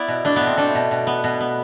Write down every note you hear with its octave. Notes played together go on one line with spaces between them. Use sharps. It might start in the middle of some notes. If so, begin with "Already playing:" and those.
Already playing: B3 E4 D5
B2
A3 D4
B2 B3
C4
A3 D4
B2
B2
B3
B2
B3